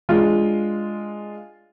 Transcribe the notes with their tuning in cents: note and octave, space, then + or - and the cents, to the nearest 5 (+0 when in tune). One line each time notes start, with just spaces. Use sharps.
G#3 +0 D4 +0 F4 +0